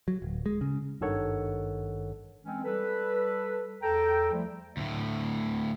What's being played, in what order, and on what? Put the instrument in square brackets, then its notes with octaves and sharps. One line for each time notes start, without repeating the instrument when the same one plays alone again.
[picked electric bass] F#3
D1
G#3
C#3
[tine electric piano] G#1 G2 D#3 A4 C#5 F#5
[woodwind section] E3 G#3 C4 C#4
G3 A4 B4
E2 A4 G5 A#5
F3 G3 A3 E4
[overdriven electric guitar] D2 A2